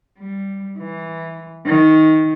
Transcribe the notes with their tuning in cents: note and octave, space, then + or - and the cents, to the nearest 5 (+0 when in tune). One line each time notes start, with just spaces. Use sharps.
G3 +0
E3 -5
D#3 +15